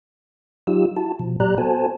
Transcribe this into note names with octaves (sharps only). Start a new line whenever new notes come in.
F#3 D#4 F4 G4 E6
E4 F#4 A5
B2 F3
A#2 F#3 G4 D5 A#5 F#6
B3 F#4 A4 C5 G#5 A5